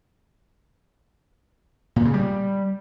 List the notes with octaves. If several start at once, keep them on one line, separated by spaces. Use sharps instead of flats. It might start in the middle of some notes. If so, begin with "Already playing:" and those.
A#2
C#3
G3